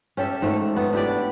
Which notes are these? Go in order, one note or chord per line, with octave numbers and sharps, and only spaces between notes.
C#4 G4 A4 E5
G#2 A3
B3 A4
D4 E4 G4 D5